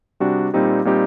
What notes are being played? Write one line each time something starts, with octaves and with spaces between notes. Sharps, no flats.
C3 G3 D4 F#4
A#2 G3 C4 D#4 G4
A#2 G3 C4 D#4 G4